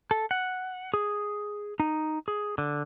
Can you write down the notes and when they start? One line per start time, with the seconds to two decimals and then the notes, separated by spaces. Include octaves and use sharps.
0.11 A4
0.31 F#5
0.94 G#4
1.80 D#4
2.28 G#4
2.58 D3